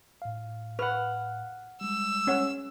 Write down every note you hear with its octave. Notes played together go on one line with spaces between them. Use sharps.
A2 F5
B4 F#5 F6
G3 G#3 E6
C#4 C#5 F#5